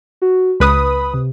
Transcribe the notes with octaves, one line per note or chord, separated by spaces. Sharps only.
F#4
C#2 B4 B5 D#6
C3